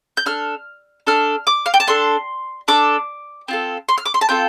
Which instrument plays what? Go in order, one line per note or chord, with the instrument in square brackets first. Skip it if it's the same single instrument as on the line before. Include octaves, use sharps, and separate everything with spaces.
[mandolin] G6
D4 A4 F6
D4 A4 F6
D6
F5
G5
A5
D4 A4 C6
D4 A4 D6
C4 F4 A4
C6
F6
D6
C6
A5
C4 F4 A4 G5